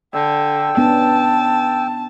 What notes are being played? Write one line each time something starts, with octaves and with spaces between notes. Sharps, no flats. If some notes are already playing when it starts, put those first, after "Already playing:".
D3 G5 E6
B3 C#4 D4 A5